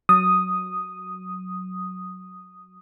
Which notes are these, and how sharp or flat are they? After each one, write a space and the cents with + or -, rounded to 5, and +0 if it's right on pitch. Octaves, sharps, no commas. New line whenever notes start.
F#3 +0 D#6 +0